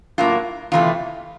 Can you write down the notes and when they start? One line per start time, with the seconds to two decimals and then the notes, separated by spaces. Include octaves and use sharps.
0.18 A2 F#3 A#3 F4
0.72 E2 C3 E3 A3 F4